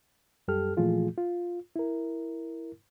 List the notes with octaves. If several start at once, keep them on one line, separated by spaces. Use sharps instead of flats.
F#2 G3 G4 A4 F6
A#2 E3 F3 A3 F4 G#4
F4
E4 A#4